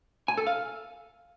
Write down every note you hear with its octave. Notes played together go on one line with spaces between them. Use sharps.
G#5
A4
F5